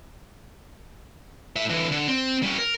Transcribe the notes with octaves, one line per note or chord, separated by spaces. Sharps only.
A2 E5
D3 E3
D3
C4
G3 C#4
A#4